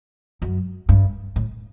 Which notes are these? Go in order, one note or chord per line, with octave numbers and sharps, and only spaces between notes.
F#2
G2
A2